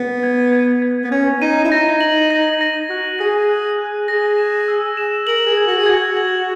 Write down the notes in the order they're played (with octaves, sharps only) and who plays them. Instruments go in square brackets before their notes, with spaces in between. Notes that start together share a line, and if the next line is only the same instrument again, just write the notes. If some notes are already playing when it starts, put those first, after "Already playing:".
Already playing: [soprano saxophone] B3
[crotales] G#6
G#6
G#6
[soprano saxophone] B3
[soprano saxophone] C#4 [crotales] G#6
[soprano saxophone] D#4 [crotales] D#7
[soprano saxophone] E4
[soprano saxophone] D#4 [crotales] A#6
[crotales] F#7
A#6
A#6
[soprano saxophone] F#4 [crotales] F#6
[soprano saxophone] G#4 [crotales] A#6
[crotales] F#6
F#6
[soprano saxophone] G#4 [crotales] A#6
[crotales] E7
E6
E7
[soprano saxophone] A#4 [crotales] F#7
[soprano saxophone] G#4
[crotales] G#6
[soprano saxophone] F#4
G#4
[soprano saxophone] F#4 [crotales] G#6
[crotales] F#7